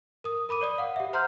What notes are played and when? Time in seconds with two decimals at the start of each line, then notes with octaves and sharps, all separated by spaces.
0.24 A#4 D#6
0.49 A#4 B5 D6 D#7
0.61 C#5 D5 D#6
0.78 F5 F#5
0.96 G4 E5
1.13 C5 F#5 A#5 C6 F6 G6